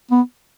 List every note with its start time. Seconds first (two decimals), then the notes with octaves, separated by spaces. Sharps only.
0.11 B3